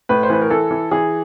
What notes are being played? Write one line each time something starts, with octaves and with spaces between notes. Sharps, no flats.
A2 B4
C5
E3 B4
A#4
E3 A4
E3
E3 G#4